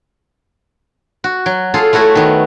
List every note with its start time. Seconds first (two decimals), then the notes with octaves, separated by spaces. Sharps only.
1.24 F#4
1.46 F#3
1.74 F4 G#4 A4 F5
1.93 A3 E4 F#4 C#5
2.15 D#3 B3